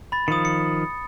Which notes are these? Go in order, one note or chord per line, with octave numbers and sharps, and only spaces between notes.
B5 A6
D#3 F3 D#6 C#7
C#7